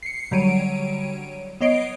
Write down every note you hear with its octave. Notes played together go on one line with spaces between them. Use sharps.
C7 C#7
D3 F#3 G3 C#5 D7 D#7
B3 C#5 D#5 C7 D7